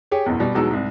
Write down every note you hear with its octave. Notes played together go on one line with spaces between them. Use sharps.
G4 G#4 C#5
F#1 B1 E2
B2 G3
E2 B2 F#3 G#3 D#4 E6
C2 G#2